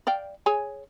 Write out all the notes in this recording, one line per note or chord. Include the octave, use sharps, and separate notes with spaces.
D5 F5 G5
G#4 C#5 G#5